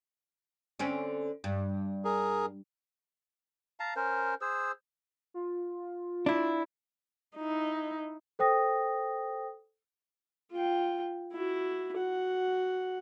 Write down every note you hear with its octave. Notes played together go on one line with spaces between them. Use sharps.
D3 C4 C#4
G2
G#4 A#4
F5 A5 A#5
C#4 A#4 C5
G#4 C5 E6
F4
D4 E4
D#4 E4
A4 C5 G5 D#6 A#6
F4 G5
E4 F#4
F#4 F#5